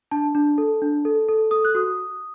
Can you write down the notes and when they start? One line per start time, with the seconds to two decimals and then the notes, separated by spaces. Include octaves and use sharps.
0.11 D4 A5
0.35 D4
0.58 A4
0.82 D4
1.05 A4
1.28 A4
1.51 A4 D#6
1.65 F#6
1.75 F#4 D#6